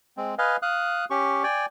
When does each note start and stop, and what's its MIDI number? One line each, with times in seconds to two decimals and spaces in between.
0.17 0.35 56
0.17 0.35 60
0.38 0.57 71
0.38 0.57 75
0.38 0.57 77
0.38 0.57 80
0.62 1.05 77
0.62 1.05 87
0.62 1.05 90
1.10 1.43 61
1.10 1.43 67
1.10 1.43 85
1.43 1.66 74
1.43 1.66 79
1.43 1.66 80